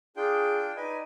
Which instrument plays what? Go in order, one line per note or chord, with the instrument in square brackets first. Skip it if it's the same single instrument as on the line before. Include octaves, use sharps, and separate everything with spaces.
[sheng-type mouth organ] D4 F4 G5 [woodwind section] G#4
[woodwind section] D#4 D5 D#5 [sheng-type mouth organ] B4 G#5